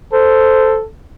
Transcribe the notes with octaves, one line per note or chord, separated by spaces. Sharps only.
A4 C5